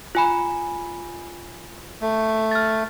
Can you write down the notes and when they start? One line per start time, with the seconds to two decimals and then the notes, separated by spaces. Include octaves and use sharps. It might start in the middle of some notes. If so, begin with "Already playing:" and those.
0.15 F4 G#5 B5
2.01 A3
2.51 F6 A6